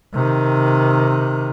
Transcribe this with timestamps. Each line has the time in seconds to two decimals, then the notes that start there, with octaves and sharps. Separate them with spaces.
0.14 C3 D#3